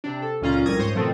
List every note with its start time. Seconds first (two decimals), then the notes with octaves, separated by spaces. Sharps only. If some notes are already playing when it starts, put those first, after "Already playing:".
0.04 C3 D4
0.22 A4
0.41 C#2 A#2 C#4 F4 A#5
0.66 C2 F2 A#3 D#6 G#6 A#6
0.79 G#2 C5 C#5 D#6
0.95 B2 D#3 F3 A3 B3 C4